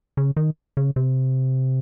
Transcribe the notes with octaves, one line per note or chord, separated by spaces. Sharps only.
C#3
D#3
C#3
C3